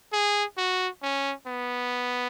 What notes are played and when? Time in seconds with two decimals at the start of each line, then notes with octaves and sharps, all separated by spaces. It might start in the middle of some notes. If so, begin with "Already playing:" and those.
0.13 G#4
0.57 F#4
1.02 C#4
1.47 B3